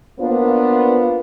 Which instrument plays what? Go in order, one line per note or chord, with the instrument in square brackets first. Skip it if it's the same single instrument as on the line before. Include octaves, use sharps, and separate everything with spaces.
[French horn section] A#3 B3 D4 F4 C5